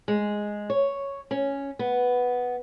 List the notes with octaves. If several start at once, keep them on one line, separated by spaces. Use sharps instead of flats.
G#3
C#5
C#4
B3